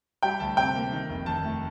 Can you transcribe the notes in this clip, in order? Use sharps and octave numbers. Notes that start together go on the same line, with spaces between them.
G3 G5
D2 A5
C3 G5
A#3
D#3
F1
D#2 A5
A3